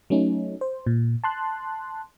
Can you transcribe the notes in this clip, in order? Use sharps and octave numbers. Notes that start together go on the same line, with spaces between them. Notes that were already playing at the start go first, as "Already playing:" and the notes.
F#3 A3 C#4 D#4
C5
A#2
A5 C6 F#6